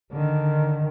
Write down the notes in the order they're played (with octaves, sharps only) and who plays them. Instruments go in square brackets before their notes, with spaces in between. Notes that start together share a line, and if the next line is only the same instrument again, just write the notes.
[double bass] D3 D#3